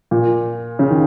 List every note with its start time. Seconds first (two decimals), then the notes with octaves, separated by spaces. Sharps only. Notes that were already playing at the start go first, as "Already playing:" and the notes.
0.11 A#2
0.79 C#3
0.90 D#3